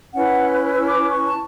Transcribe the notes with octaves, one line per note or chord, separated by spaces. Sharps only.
C#4 E4 B4 F#5
E6
D6
C#6
A5